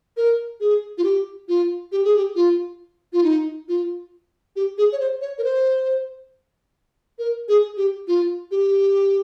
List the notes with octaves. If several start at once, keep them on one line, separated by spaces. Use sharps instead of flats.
A#4
G#4
F4
G4
F4
G4
G#4
G4
F4
F4
D#4
F4
G4
G#4
C#5
C5
C#5
A#4
C5
A#4
G#4
G4
F4
G4